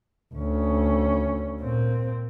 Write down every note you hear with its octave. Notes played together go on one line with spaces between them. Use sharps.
D2 C#4
A#2 C4